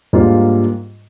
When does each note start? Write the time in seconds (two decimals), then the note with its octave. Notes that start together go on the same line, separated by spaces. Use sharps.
0.13 G#2 G3 A#3 D4 F4